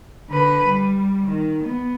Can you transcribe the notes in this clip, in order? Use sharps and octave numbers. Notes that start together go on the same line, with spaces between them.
D3 B4
G3
D#3
B3